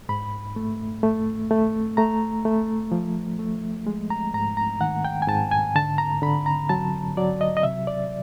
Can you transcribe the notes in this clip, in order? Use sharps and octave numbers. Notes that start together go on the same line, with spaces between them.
G#2 B5
A3
A3
A3
A3 A#5
A3
F3
A3
G#3
A#5
G#2 A#5
A#5
D#3 F#5
G5
G#5
G#2 A5
G#5
D3 A5
A#5
D3 B5
A#5
F#3 A5
F#3 D5
D#5
D#5
C3 E5
D5